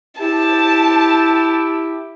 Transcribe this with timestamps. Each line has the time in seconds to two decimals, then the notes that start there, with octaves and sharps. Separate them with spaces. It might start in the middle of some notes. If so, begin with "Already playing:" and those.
0.19 E4 G4 A5